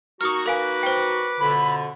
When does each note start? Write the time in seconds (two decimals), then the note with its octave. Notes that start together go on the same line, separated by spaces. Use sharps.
0.21 A#3 D#4 F#4 A#5 C#6 D#6 F6
0.46 A#4 B4 F5 G#5 D6
0.83 C5 G5
1.40 F2 B2 D3 B5